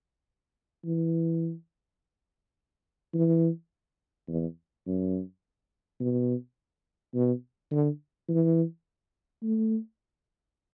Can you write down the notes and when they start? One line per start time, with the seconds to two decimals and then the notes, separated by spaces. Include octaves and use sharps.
0.84 E3
3.14 E3
4.28 E2
4.86 F#2
6.00 B2
7.14 B2
7.71 D3
8.28 E3
9.42 A3